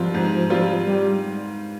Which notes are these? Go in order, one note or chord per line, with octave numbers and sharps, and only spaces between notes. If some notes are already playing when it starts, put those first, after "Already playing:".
Already playing: G#2 F3 G3 C4 F4
G#2
G3 C4 F4
G3